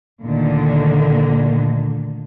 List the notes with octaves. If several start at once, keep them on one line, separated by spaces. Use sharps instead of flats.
D2 A#2 D3 D#3 A#3